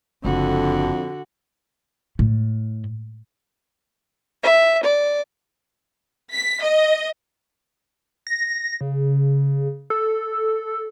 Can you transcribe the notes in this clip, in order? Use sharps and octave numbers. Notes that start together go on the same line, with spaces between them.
F#1 F2 D3 F#4
A2
E5
D5
B6
D#5
A#6
C#3
A4